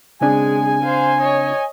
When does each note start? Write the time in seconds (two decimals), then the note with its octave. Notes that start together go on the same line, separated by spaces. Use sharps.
0.21 C#3 G#3 C4 D4 G#4 G#5
0.83 C5 F5
1.22 C#5 D#5